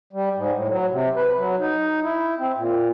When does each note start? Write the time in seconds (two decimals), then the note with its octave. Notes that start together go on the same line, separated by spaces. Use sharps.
0.13 G3
0.36 G#2
0.54 A2
0.69 F#3
0.91 C3
1.16 B4
1.38 F#3
1.59 D#4
2.03 E4
2.39 C4
2.56 A#2